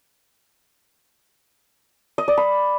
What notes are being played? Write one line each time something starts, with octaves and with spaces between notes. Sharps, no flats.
D#5
D5
B5